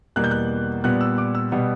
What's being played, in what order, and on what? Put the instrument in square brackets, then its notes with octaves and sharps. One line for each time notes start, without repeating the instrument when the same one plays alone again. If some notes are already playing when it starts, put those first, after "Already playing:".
[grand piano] E2 B2 G3 A#3 F#6
G6
F#6
A#2 G3 B3 F#6
E6
D6
E6
B2 G3 B3